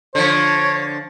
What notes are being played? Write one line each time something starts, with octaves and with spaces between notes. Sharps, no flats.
D3 F3 C#5